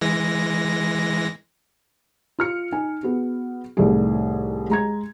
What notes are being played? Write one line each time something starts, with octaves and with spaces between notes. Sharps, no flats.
E3 G#3 A#6
F4 F6 C#7
D#4 G#5
B3 F#4 G#4
C2 A2 D#3 G3 A3 G#4
G#3 A#5 G#6